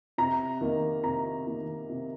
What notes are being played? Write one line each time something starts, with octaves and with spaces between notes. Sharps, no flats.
C3 A#5
D#3 A#3
C3 A#5
D#3 A#3
C3